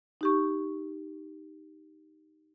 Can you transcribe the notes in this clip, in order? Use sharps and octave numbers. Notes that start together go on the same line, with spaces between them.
D#4 G4 C#6